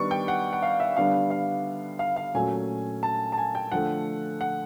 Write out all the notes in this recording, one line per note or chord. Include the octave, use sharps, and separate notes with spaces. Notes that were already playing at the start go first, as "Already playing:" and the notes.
Already playing: D#3 G3 B3 D4 C#6
G5
F#5
F#5
F5
E5
D3 G3 B3 D4 F5
F5
F5
F5
A#2 F#3 A3 C#4 G#5
A5
A5
G#5
G5
D3 F3 A3 F#5
F#5